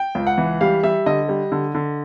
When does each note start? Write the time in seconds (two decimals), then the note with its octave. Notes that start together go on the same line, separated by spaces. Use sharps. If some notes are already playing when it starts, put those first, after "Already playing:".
Already playing: G5
0.15 C#2
0.27 F#5
0.38 E3
0.61 G3 F5
0.83 G3 E5
1.06 D3 D#5
1.29 G3
1.52 D3
1.75 D3